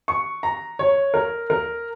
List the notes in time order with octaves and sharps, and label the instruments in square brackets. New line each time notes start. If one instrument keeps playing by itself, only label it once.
[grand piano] C#6
A#5
C#5
A#4
A#4